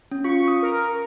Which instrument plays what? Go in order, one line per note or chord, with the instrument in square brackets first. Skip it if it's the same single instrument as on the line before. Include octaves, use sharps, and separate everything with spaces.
[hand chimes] C#4
[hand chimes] F4 [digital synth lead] C#6
[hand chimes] D#6
[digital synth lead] A#4